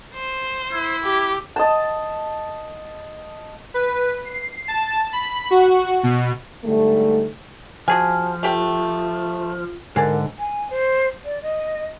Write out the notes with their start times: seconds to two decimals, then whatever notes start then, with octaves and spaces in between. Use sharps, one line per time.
0.15 C5
0.72 E4
1.04 G4
1.56 D#5 A5
3.74 B4
4.25 C7
4.68 A5
5.13 B5
5.51 F#4
6.03 B2
6.65 G#2 D3 G3 A3
7.88 F3 F#4 G#4 G#5 A5
8.43 A3 F4 G4 G5
9.96 G#2 D3 G#4 A#4 D5
10.39 G#5
10.70 C5
11.25 D5
11.42 D#5